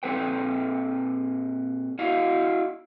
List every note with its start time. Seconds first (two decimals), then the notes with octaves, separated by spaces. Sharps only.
0.03 A#2 C4 A4 B4 G5
1.99 E4 F#4 D#5 F5